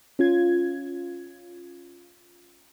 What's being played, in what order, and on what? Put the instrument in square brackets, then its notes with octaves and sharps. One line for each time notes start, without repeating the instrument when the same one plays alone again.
[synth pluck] C#4 F4 G#6